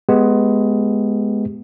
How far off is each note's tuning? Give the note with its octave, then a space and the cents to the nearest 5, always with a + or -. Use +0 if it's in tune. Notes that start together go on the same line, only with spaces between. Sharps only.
G#3 +15 B3 +0 G4 +0